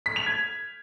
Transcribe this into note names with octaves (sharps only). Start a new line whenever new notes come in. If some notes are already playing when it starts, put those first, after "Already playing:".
B6
F7
G#6